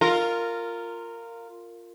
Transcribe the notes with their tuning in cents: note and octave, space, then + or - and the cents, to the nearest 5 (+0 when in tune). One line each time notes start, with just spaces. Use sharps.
F4 +0 A#4 -15